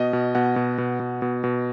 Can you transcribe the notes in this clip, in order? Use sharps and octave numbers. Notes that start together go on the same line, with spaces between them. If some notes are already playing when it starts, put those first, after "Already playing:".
Already playing: B2 D#5
B2
B2 F#5
B2
B2
B2
B2
B2